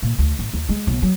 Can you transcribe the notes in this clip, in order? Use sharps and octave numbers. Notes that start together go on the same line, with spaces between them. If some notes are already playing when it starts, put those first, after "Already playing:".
A#2
D2
A1
D#2
G#3
B1
F#3